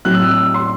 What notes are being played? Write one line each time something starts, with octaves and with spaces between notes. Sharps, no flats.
A2 F#3 C4 E4 F#6
E6
F#6
E6
C6